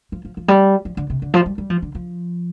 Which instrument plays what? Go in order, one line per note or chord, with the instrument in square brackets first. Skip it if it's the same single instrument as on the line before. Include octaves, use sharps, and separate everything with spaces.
[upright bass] F3
F3
F3
G3
F3
D3
C3
D3
F3
G3
G3
F3
D3
F3